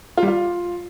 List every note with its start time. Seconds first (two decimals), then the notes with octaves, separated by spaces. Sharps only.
0.17 F4
0.23 G3
0.28 F4